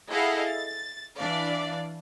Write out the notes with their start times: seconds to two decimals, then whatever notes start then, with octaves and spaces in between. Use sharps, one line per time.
0.10 E4 G#4 A4 D#5 F5 F#5
0.47 A6
1.17 E3 D4 D5 F5